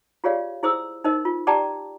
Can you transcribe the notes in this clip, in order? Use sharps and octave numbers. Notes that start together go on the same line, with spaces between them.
F4 G4 G#4 C#5 D5 F5
E4 G#4 C5 D#6 E6
D#4 A#4 C5 D#5
F4
G4 D5 G5 A5 A#5 D6